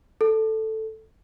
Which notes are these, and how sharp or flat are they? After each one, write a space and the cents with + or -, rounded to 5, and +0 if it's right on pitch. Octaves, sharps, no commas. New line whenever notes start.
A4 +0